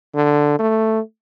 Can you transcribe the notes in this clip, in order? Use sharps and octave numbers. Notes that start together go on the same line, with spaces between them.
D3
A3